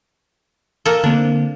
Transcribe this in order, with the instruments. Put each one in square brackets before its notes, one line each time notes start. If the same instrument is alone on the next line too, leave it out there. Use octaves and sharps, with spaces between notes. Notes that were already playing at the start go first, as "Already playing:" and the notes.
[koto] A#3 A4
[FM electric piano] D3 A#3 C4 [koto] D4